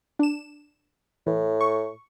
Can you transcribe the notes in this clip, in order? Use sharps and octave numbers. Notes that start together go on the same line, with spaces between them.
D4 E7
A2 E3
C#6